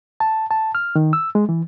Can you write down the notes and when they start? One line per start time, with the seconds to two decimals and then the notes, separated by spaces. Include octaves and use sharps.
0.20 A5
0.51 A5
0.75 F6
0.96 D#3
1.13 E6
1.35 G#3
1.49 E3